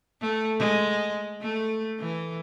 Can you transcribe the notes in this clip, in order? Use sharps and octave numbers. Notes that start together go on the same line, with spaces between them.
A3
G#3
A3
E3